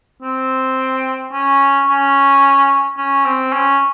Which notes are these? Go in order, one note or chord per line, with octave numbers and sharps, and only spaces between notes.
C4
C#4
C#4
C#4
C4
C#4